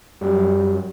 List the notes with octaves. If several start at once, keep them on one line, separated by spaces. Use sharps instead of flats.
F#2 G3